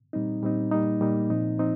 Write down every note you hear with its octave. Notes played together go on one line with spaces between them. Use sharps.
A#2 G3 C4 D#4
A#2 G3 C4 D#4
A#2 G3 A#3 D#4
A#2 G3 A#3 D#4
A#2 F3 C4 D#4
A#2 F3 C4 D#4